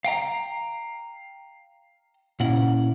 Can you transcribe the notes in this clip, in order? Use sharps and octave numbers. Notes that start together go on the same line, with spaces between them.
F5 G5 A#5
A#2 C#4 E4 F#5